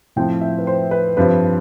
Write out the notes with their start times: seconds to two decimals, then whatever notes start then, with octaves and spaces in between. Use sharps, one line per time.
0.16 A2 F3 C4 G5
0.41 E5
0.58 B4
0.67 C5
0.91 B4
1.17 G2 F3 C4 B4